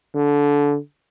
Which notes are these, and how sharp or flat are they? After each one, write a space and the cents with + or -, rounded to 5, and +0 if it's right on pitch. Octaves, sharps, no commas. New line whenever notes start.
D3 -20